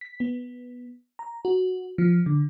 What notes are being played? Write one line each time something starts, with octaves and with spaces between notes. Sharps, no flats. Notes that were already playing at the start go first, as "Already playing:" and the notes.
B6
B3
A#5
F#4
F3
D3